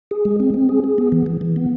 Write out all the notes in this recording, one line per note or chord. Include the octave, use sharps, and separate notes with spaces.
G#4
G#3
C4
C4
G#4
G#4
B3
E3
E3
E3
B3